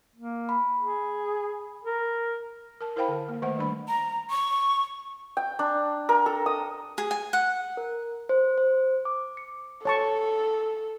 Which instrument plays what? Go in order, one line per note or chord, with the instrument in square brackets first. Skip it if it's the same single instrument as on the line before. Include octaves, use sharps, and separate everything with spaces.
[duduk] A#3
[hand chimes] B5
[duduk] G#4
A#4
[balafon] A#4 A5
E4 A#4 C5 F5 G5 B5
D3
A#3
D#3 A3 C5 F#5
D#3 G3 D4 B5
[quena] A#5
C#6
[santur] G5
D4
A#4
A4
D#6
[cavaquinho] G#4
G#5
F#5
[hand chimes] A#4
C5
C5
D6
C#7
[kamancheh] A4 [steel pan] C#5 A5 C#6